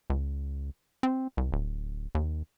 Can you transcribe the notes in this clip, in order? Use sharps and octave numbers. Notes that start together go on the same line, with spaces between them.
C#2
C4
C2
D1
D#2